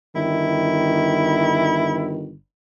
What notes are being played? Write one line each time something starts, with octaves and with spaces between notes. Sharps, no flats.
G1 D#3 E4